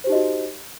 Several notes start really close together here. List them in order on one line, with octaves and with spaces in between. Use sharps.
C5 G4 D#4 D#5 F#4